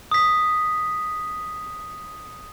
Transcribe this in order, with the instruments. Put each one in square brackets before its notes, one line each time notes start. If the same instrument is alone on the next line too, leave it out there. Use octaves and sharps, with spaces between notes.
[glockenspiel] D#6 B6